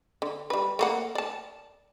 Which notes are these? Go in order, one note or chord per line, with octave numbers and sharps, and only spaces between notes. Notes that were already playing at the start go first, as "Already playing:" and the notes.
D3
G3 B4
A3 A#3 F#5
D5 A5